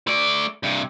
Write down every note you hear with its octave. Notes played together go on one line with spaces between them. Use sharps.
A3 D5
G2 C3